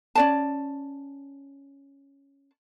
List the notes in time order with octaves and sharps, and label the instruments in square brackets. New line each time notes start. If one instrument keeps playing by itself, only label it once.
[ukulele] C#4 D5 A5